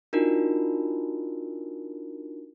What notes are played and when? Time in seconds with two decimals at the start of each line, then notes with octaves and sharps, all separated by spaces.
0.13 D4 D#4 F4 F#4 A#4